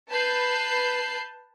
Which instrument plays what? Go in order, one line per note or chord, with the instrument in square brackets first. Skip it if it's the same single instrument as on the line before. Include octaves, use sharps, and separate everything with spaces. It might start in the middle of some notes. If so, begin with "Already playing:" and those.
[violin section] B4 A5 G6 C7